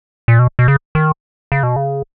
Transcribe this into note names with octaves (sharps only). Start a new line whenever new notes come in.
A#2
B2
B2
C#3
D#3
C#3
B2
C#3